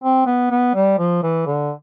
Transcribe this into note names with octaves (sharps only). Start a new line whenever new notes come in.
C4
B3
B3
G3
F3
E3
D3